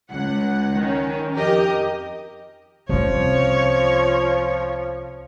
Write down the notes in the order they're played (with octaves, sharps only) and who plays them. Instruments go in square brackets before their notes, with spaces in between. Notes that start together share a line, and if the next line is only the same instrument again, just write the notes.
[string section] C#2 F#5
D#3 C#4
F2 G4 A#4 D#5
[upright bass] C2 C#4 [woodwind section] F3 [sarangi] C#5